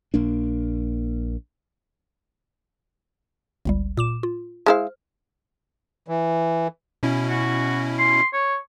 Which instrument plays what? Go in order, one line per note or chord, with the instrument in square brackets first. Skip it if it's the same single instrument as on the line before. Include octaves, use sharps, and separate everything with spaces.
[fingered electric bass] A#1 A#3 D4
[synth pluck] G1 C#2 G3
A#2 D6 E7
F4
[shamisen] G#3 E4 F5 [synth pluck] C5 F6
[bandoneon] E3
[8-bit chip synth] B2 C#4 E4
[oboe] F#4
C6
C#5